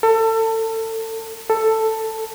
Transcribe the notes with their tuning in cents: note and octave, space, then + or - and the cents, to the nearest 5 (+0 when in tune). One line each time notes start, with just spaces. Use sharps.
A4 +30
A4 +10